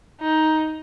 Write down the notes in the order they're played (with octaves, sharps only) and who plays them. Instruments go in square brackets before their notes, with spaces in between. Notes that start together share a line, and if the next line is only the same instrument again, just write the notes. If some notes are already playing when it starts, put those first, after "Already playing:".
[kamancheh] D#4